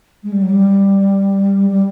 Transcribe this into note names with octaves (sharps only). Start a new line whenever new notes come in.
G#3
G3
F#3
G3
G3